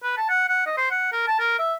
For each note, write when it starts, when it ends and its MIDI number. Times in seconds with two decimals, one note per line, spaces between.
0.03 0.15 71
0.17 0.29 81
0.29 0.47 78
0.49 0.64 78
0.66 0.77 75
0.78 0.88 72
0.91 1.11 78
1.12 1.24 70
1.27 1.39 81
1.39 1.58 70
1.59 1.74 76